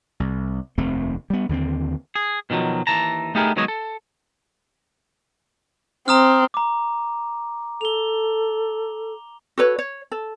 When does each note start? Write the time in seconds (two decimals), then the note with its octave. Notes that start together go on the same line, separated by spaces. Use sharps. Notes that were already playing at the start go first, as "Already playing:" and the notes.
0.20 C2
0.78 F1 D#2 A3 C4
1.30 G3 B3
1.49 D#2 D3 A3 C4
2.15 G#4
2.50 B2 D#3 F3 F#3
2.87 D#2 E3 A5 A#5
3.35 A3 B3 D#4 G4 G#4 A#4
3.56 D#3 F#3 G#3 B3 C#5 D#5
3.68 A4
6.08 C4 A#5 D#6 F6
6.54 A#5 D6
7.81 A4 F7 G7
9.58 F#4 A4 B4 C#5
9.79 C#5
10.12 A4